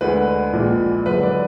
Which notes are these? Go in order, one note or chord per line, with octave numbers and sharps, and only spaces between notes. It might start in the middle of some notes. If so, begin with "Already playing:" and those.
D2 D3 G#3 B4
A#1 A#2 G#3
F#2 D3 G#3 B4
D5